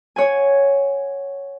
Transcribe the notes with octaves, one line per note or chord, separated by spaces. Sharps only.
C#5 F#5 G#5